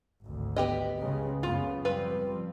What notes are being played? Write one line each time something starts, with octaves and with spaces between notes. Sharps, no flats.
G#1 D2
B3 G4 D#5
C#2 C#3 G#3
F#2 C#3 B3 F4
F3 G3 C4 F4 B4